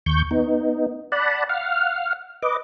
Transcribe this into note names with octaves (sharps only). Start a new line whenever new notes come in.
D#2 C#6 G6
B3 D#4
D5 F#5 A5 B5
F5 F#5 F6
B4 D#5 D6